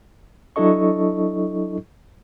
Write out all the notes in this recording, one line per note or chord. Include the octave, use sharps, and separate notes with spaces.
F#3 D4 E4 A4 D#5 C#6